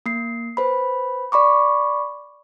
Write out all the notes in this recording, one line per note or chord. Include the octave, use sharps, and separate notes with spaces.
A#3 C7
B4 C5 B5
D5 B5 C#6 D6